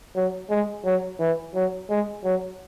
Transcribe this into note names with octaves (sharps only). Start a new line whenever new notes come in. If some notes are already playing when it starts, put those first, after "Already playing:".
F#3
G#3
F#3
E3
F#3
G#3
F#3